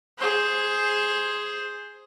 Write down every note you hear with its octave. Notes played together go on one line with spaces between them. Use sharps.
G#4 C5